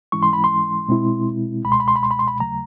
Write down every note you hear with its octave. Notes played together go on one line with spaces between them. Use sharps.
G#2 E3 G#3 C#4 E4 C#6
C6
B5
C6
B2 G#3 C4 E4
C#2 B2 G#3 B5
C6
B5
C6
B5
C6
B5
C6
B5
D#2 C#3 F#3 A3 A#5